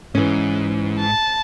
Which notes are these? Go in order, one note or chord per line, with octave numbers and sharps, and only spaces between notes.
G#2 E3 C#4
A5